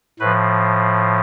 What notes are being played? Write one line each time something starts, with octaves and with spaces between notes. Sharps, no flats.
A2 F3 B4